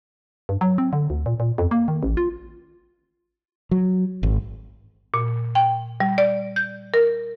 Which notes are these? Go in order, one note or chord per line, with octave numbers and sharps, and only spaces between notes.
G2
F#3
C4
D3
D2
A#2
A#2
F2
A#3
D#3
A1
F4
F#3
G#1
A#2
G5
G3
D5
G6
A#4